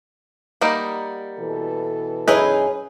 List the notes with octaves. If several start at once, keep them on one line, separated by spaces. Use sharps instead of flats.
G3 A#3 D#4 F#5
B2 E3 A4
F#2 C#4 D#4 E4 G#4 B4 G#5